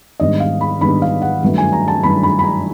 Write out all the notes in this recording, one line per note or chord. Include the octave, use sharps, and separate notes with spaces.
G#2 D#3 G3 B3 D4 D#5
F5
B5
G#2 D#3 G3 B3 D4 B5
F5
F#5
G2 D#3 F#3 A3 C#4
G#5
A#5
A5
G2 D#3 F#3 A3 C#4 B5
B5
B5
A#5